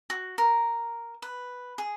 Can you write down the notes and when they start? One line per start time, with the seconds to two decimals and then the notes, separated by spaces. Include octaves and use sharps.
0.10 F#4
0.38 A#4
1.22 B4
1.78 G#4